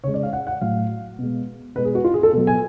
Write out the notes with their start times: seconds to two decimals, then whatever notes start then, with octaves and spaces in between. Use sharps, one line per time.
0.04 C#3 G#3 C#5
0.14 D5
0.23 F5
0.33 F#5
0.47 F#5
0.61 A2 F#3 F5
1.19 B2 G#3
1.75 B2 G#3 B4
1.85 G#4
1.95 F#4
2.04 F4
2.14 G#4
2.23 A4
2.33 B2 F#3
2.47 G#5